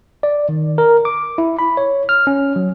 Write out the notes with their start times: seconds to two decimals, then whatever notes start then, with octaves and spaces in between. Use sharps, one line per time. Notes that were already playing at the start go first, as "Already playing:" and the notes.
0.23 D5
0.49 D#3
0.78 A#4
1.05 D6
1.38 E4
1.59 B5
1.77 C#5
2.09 F6
2.27 C#4
2.56 F#3